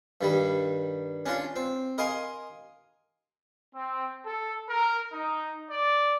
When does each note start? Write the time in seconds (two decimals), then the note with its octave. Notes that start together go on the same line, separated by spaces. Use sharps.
0.21 G2 D#3 G3
1.26 C#4 D4 F4
1.56 C4
1.98 A#4 D#5 F5 G#5 C6
3.74 C4
4.25 A4
4.68 A#4
5.12 D#4
5.71 D5